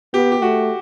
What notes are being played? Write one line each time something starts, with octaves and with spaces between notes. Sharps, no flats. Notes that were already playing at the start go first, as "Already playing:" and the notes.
B3 G4
G4
A3 F#4